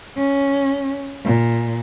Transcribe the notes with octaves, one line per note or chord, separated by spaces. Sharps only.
C#4
A#2